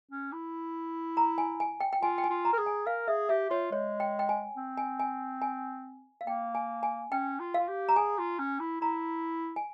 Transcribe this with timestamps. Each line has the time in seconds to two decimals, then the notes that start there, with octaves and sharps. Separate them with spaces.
0.11 C#4
0.33 E4
1.17 A#5
1.38 G#5
1.60 G#5
1.80 G5
1.93 G5
2.02 F4 G#5
2.18 G5
2.24 G#5
2.30 F4
2.45 A#5
2.53 A#4
2.58 G#4
2.66 G#5
2.86 A#4 F5
3.08 G#4 E5
3.29 G4 E5
3.50 F4 C#5
3.71 G#3 C#5
4.00 G5
4.19 G5
4.29 G#5
4.57 C4
4.77 G#5
4.99 G#5
5.42 G#5
6.21 F5
6.27 A#3 G5
6.55 G#5
6.83 G#5
7.12 C#4 G5
7.40 F4
7.54 F5
7.59 F4
7.68 G4
7.89 A#5
7.96 G#4 G#5
8.18 F4
8.39 C#4
8.60 E4
8.81 E4 A#5
9.56 G#5